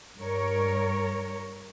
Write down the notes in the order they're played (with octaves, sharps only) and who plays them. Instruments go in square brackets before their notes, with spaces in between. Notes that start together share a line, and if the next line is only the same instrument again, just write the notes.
[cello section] G2 A#4 C#5